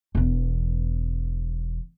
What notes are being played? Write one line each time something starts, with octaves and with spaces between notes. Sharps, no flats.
E1 E2